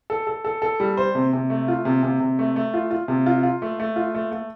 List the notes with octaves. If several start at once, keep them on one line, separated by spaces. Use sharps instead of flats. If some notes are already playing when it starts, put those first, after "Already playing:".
A4
A4
A4
A4
G3
C5
C3
C3
A3
F4
C3
C3
C3
A3
A3
F4
F4
C3
F4
F4
A3
A3
F4
A3
A3